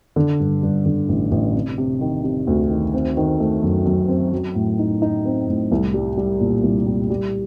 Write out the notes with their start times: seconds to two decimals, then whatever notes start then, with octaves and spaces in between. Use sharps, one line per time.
0.16 D3
0.40 G2
0.63 G2
0.86 D3
1.09 A1
1.31 A1
1.54 C3
1.78 C3
2.01 D#3
2.24 C3
2.47 D2
2.70 D#3
2.94 C4
3.17 D#3
3.40 A3
3.63 F#2
3.86 F#2
4.09 C4
4.32 F#3
4.55 A2
4.79 D#4
5.02 D#4
5.25 C4
5.49 A2
5.72 C2
5.94 G3
6.17 G3
6.41 A#2
6.63 C2
6.86 G3
7.10 G3